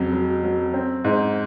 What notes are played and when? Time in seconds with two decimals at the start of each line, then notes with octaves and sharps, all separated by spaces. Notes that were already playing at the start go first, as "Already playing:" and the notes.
Already playing: F2 C#3 F#3
0.13 F#3
0.44 F#3
0.74 C4
1.04 G#2